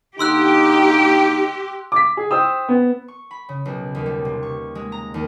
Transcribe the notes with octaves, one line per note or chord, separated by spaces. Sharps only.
D3 A#3 D#4 G4 C6 E6 F#6
D6 B6
G#4
C5 G5 D#6 E6
B3
C#6
B5
C#3
B1
D#2
G3
C3
C#6
G#3
A#5
D#2